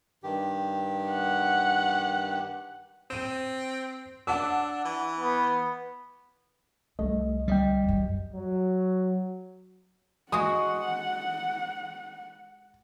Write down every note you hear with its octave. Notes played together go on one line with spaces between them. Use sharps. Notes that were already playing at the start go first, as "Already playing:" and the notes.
G2 D#3 G4
F#5
C4 D#7 E7
D4 F#5 A5 E6
E3
B3
C2 G3 A3 D#5
D2 G3 D#5 G5
C#2 F#2
F#3
G#3 F#4 F#5 D#6